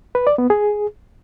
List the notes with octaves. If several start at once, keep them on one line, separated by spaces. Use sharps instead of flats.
B4
D5
B3
G#4